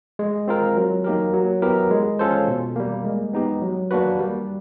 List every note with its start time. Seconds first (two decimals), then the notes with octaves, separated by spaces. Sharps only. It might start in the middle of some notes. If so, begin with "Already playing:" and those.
0.19 G#3
0.48 C4 F4 A#4
0.76 F#3
1.04 A#3 D#4 G4 A#4
1.33 F#3
1.62 B3 E4 G4 A#4
1.91 G#3
2.19 C#4 F4 A4 C5
2.48 B2
2.76 G3 A#3
3.05 G#3
3.34 B3 D#4 G4
3.62 F#3
3.91 A#3 D4 F#4 B4
4.19 G3